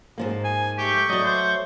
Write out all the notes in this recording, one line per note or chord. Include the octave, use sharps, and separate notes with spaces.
G#2 F3 A#3
G#5
A3 G4 C#6 G6
F#3 D5 D#5
C5